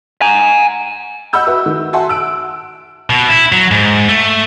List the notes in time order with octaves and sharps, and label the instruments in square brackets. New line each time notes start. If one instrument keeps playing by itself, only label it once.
[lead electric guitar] G#5 A#5
[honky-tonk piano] D#5 F#5 B5 E6 G6
F#4 B4 E5
D#3
F#4 E5 F#5 G#5 A5 C6
E6 F#6 D7
[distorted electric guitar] B2
E4
F#3
G#2
A3